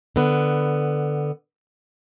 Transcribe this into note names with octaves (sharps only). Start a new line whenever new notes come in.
D3 B3